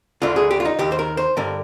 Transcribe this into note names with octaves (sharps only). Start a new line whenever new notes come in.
D2 D3 F4
G#4
G4
F4
D#4
D#2 D#3 G4
C5
A#4
C5
G2 D3 A#4